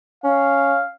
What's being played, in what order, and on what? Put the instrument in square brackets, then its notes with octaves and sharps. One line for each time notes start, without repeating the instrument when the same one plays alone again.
[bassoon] C#4 [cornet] F5